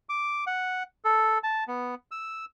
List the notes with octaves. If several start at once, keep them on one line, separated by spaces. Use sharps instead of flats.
D6
F#5
A4
A5
B3
E6